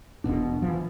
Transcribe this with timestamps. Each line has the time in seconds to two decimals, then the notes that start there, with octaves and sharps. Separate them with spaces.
0.24 E1 C2 B2 D4
0.62 E3 F3